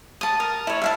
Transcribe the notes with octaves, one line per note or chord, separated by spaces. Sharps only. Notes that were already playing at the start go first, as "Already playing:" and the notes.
A5 D#6
A#4
E4 C#5
E5 F5 A5